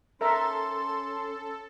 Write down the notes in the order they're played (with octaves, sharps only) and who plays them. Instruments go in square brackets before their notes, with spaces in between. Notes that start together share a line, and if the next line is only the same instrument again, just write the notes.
[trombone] C#4 [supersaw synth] A4 [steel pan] A#4 E5 A#5 [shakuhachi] C6